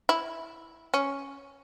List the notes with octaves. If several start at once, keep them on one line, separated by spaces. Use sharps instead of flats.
E4
C#4